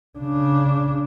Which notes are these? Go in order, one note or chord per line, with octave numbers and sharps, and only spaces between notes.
C#3 D4